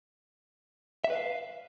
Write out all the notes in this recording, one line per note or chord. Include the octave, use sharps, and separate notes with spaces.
E5
B4
F5